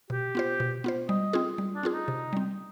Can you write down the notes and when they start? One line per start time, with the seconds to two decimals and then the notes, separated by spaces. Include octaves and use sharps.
0.10 B2 G4
0.35 B3 F4 C5
0.60 B2
0.84 B3 F4 C5
1.09 G3 D#5
1.33 C4 F4 G#4
1.58 G3
1.75 D4
1.83 C4 F4 G#4
1.92 D#4
2.08 C3
2.33 G3 C4